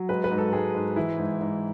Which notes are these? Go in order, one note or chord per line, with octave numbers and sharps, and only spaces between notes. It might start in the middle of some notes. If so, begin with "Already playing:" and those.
Already playing: F#3
G#3 B4
B4
G#2
A4
G#3 G#4
G#2
E3 E4
G#2
G#2